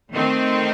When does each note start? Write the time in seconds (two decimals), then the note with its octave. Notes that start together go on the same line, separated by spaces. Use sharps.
0.12 D#3 A3 C4